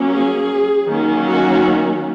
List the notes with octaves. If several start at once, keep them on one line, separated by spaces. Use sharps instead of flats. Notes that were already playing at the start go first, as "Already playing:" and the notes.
Already playing: F#3 A#3 C#4
G#4
D#3 F#3 A#3 C#4
F#4